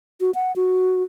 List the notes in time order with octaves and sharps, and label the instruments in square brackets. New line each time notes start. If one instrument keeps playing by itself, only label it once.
[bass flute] F#4
F#5
F#4